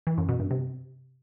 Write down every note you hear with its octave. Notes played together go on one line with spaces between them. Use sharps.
E3
F#2
B2
G2
C3